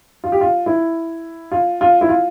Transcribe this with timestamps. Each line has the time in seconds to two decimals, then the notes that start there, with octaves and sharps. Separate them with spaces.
0.24 F4
0.32 G4
0.41 F4
0.66 E4
1.52 F4
1.81 F4
2.01 E4
2.09 F4